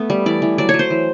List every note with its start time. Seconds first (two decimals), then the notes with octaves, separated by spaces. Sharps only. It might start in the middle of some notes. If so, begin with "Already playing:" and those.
Already playing: A3 B3
0.10 G3
0.26 E3 D5
0.42 E3
0.58 F#3 D5
0.69 F#3 C#5
0.79 C5
0.90 E3